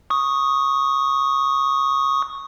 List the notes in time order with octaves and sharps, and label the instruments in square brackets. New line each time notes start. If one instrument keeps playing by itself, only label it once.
[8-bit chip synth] C#6 D#6